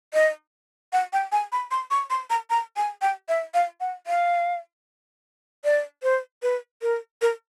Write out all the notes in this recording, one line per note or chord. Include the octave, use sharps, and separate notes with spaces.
D#5
F#5
G5
G#5
B5
C6
C#6
C6
A#5
A#5
G#5
G5
E5
F5
F#5
F5
D5
C5
B4
A#4
A#4